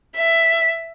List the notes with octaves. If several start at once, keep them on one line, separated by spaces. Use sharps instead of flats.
E5